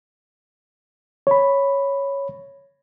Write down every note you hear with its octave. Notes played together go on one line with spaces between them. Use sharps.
C#5 B5